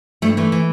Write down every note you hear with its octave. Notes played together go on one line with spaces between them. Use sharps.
G2 A3
E3 A3
E3